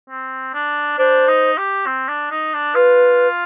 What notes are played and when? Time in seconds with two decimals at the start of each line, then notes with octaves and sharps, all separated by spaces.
0.10 C4
0.54 D4
0.98 D4 C5
1.28 D#4
1.58 G4
1.86 C4
2.08 D4
2.31 D#4
2.54 D4
2.75 F4 B4